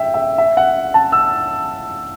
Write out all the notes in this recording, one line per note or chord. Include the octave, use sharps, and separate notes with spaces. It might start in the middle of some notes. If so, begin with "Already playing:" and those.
Already playing: E5 G5
E5
E5
F#5
A5
E6